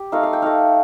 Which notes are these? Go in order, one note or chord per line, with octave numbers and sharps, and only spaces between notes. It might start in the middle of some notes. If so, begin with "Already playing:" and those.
Already playing: G4
A3 D#4 F5
F5
G5
A3 D#4 F5